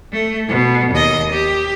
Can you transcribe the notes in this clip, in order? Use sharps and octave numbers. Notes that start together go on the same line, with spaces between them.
A3
B2
D#2 D#5
G4